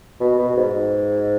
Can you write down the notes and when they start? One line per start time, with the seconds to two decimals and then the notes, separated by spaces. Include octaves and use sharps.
0.21 B2
0.39 B2
0.57 G#2